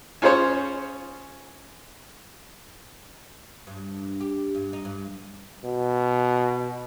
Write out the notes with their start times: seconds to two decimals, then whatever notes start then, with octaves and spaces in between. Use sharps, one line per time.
0.22 C#4 F4 G#4 C5 C#5
3.67 G2
4.21 G4
4.55 G2
4.73 D#4
4.85 G2
5.64 B2